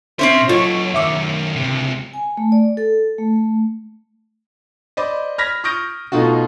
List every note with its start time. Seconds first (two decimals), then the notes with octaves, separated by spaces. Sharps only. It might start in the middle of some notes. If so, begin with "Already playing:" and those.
0.19 A#2 C4 C#4 C5 E5
0.49 F#3 F4 A4 C#5 D#5
0.94 F#2 D#3 E5 D6 E6
1.56 C#2 C3
2.13 G#5
2.37 A3
2.52 D5
2.77 A4
3.18 A3
4.97 C5 D5 D#5 B5 D6
5.38 B5 F6 G#6 A#6 B6
5.64 C#6 D#6 F6 G6 A#6 D7
6.12 B2 A3 D#4 F4 F#4